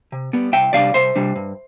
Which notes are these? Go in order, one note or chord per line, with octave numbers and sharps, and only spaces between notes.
C3
G3 B3
C2 E5 G5
C3 G3 D4 D5 F5
C2 C5 E5
C3 G3 D4
G2